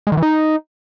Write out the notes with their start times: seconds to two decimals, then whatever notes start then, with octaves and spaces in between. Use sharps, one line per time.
0.07 G#3
0.12 D#3
0.17 E3
0.23 D#4